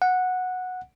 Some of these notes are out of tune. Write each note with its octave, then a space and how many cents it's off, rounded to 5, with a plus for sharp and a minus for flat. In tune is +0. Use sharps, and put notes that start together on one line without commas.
F#5 -10